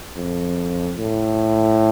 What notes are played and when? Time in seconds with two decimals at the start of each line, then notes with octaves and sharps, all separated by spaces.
0.16 F2
0.98 A2